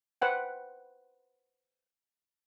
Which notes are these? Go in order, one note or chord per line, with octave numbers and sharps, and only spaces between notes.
B4 C5 F#5 G5